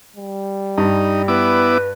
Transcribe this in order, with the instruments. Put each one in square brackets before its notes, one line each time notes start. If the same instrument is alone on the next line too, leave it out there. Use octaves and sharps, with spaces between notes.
[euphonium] G3
[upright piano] G2 [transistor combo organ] D#4
[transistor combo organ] B3 E4 D6 [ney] B4